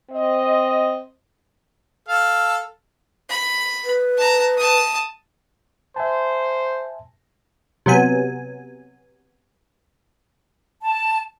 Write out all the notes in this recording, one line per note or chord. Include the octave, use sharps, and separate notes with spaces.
C4 D#5
A4 F5
B5
B4
A5 A#5
A5 D#6
C5 E5 G#5 A5
C3 F#3 B3 G#5
A5